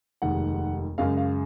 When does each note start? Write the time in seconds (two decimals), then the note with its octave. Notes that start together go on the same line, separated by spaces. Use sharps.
0.22 F1 D#2 D#3 G#3 F#5
0.98 F#2 C#3 G#3 F5
1.17 F5